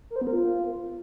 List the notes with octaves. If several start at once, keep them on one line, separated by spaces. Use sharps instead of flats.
A#4
C5
B3
A#4
F4